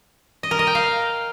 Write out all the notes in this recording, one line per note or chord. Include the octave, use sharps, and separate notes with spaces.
D#5
A#4
D#5
G5
F5